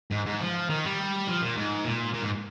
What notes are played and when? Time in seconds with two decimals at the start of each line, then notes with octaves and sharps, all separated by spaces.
0.12 G#2
0.26 G#2
0.41 F3
0.70 D#3
0.85 G3
1.27 F3
1.41 A#2
1.56 G#2
1.85 A#2
2.14 A#2
2.22 G#2